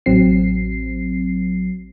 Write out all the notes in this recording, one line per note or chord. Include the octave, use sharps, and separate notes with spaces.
A1 F#3 C4 C7